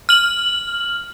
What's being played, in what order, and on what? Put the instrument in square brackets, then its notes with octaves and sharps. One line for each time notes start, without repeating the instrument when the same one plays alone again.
[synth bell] F6 F#7